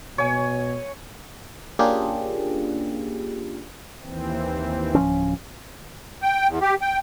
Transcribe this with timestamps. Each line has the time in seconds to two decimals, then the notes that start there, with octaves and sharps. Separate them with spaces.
0.18 B2 C#5 G#5
1.79 A#3 C#4 D4 F4 G4 G#4
4.02 D#2 E3 C4
4.95 D1 F3 C#4
6.22 G5
6.48 E2
6.61 G4
6.82 G5